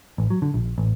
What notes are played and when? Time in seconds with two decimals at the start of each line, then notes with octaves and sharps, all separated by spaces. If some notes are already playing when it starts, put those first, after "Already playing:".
0.18 A1
0.30 F#3
0.42 D3
0.54 A#1
0.78 A1